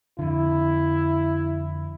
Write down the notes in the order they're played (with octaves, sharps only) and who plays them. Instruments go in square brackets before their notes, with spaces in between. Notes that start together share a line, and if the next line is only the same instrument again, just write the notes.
[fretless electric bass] F2 D3 [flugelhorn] E4